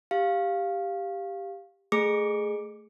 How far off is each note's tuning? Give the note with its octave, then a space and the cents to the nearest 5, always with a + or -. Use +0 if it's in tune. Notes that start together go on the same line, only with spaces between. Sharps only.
G4 +5 F5 +0
A3 +0 G#4 +0 D6 +0